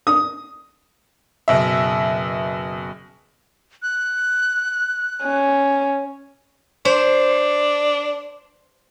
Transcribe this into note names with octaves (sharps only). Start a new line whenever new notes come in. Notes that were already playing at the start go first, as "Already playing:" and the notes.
D#6
F#1 B2 E5
F#6
C#4
D4 C5